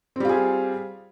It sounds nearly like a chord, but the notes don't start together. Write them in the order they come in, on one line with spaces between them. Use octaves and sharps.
C4 G3 F4 G#4